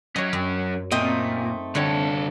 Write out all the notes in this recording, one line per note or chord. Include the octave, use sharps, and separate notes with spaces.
F#3 C#4 C#5 D#5
F#2
A#2 A3 C4 D#4
C2 D3 A4 C#5